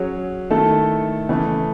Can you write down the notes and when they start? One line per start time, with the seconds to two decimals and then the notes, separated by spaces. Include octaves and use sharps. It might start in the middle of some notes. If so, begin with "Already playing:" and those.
Already playing: F#3 C#4 G#4
0.51 D#3 A3 E4 A4
1.29 C#3 E3 A3